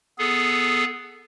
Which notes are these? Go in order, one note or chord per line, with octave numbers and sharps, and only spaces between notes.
B3 G#4 A4